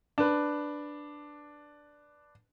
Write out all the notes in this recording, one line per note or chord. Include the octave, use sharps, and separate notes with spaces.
D4 B4